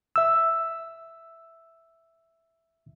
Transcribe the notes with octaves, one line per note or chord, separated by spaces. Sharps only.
E5 E6